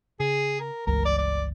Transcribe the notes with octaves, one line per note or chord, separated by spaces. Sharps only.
C#3 G#4
A#4
G1 C#2 E3 A#4
D5
D5